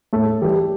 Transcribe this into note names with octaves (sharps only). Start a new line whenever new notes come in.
A2 A4
E3 G3 G4